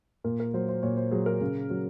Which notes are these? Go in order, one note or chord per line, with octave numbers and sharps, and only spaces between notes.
A#2 A#4
A#4
F#3 C5
C5
A#2 C#5
C5
F#3 G#4
A#4
C#3
F#3